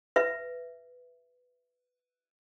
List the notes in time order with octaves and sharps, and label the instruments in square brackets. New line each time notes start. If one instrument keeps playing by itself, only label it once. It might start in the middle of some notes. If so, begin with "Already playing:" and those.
[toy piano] B4 E5